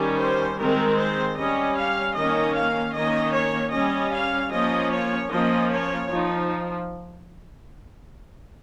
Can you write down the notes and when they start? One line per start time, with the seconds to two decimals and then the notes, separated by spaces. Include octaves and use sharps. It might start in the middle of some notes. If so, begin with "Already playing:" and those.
Already playing: D#3 G3 C#4
0.19 C5
0.59 D#3 G#3 C4 A#4
0.97 C5
1.37 G3 C#4 D#5
1.77 F5
2.16 D#3 A#3 C#4 D#5
2.55 F5
2.94 D#3 A#3 C#4 D#5
3.34 C#5
3.73 G3 C#4 D#5
4.13 F5
4.52 F3 A#3 C#4 D#5
4.91 C#5
5.31 F3 A#3 C#4 D#5
5.70 C#5
6.10 F3 D#4